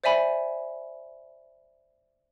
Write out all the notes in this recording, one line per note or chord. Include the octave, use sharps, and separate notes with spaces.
C5 D5 E5 G#5 B5